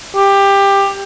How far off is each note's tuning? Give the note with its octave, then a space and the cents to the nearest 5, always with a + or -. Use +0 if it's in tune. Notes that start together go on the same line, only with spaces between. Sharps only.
G4 +15